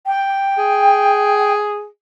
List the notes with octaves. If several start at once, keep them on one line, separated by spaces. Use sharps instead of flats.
G5
G#4